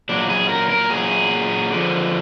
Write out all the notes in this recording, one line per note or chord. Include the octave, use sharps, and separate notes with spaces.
A#2 F#3 D4
G#4
A#4
A#4
A#2 F#3 G#4
D3 F3